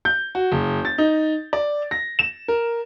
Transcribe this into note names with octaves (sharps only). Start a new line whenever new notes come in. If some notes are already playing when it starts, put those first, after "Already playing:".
G6
F#4
F#1
A6
D#4
D5
A#6
E7
A#4